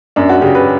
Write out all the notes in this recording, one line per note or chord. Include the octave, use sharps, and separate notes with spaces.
F#2 D4
F#4
C#3 G4
B4